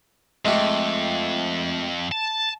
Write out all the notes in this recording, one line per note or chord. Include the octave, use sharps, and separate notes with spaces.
F2 G#3 A3 G4
A5